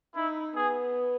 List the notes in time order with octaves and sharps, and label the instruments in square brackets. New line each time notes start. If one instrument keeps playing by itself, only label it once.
[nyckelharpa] D#4 [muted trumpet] E4
[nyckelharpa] B3 [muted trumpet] G#4